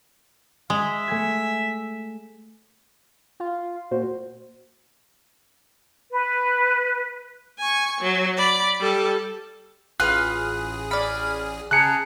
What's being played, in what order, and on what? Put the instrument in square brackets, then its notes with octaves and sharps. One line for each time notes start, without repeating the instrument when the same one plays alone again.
[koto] G#3 [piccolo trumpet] E5
[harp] A3 G#5 G#6
[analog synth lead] F4
[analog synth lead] A#2 [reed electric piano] F#4 C5
[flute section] B4
[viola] G#5 C#6
F#3
D5 B5
G3 A4
[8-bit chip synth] A1 G#4 [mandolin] F4 B4 F6 [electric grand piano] F#6
[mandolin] D5 B5 [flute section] F6 G#6
[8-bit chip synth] C#3 [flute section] G#4 A5 A#5 [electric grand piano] F#6 C#7